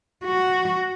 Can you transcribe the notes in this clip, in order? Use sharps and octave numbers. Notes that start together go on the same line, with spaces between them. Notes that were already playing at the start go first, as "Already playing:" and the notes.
F#4